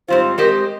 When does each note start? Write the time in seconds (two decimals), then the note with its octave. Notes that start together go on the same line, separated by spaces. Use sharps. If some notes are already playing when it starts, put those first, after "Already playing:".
0.08 G#2 G3 C4 F4 C5
0.38 G#3 C4 G4 A#4 C5 D#5